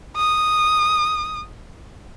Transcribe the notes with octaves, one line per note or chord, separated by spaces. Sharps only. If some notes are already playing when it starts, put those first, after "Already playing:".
D#6